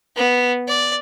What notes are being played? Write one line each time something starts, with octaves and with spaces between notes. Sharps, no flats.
B3
D5